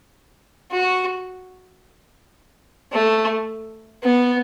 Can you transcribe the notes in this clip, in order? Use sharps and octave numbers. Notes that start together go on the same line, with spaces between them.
F#4
A3
B3